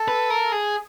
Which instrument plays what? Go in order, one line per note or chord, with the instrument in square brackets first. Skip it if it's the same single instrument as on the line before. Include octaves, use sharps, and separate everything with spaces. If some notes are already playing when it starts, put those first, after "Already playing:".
Already playing: [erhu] A4
[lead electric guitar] B4
A#4
G#4